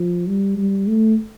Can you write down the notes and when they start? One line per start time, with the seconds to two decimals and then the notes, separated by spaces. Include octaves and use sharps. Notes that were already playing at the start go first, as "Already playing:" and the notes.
Already playing: F3
0.27 G3
0.57 G3
0.87 A3